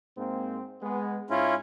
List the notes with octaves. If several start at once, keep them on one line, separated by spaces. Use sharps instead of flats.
G#2 A#3 C4
G#3 B3
G#2 C#4 E4 F4